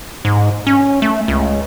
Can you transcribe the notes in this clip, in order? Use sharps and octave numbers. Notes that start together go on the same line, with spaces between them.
G#2
C#4
A3
C#2